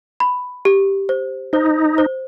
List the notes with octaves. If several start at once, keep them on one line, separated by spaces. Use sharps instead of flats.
B5
G4
C5
D#4 C5
C5